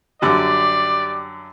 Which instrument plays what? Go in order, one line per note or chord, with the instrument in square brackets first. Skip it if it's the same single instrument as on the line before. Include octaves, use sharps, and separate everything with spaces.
[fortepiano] F#2 D3 G3 [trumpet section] G4 D5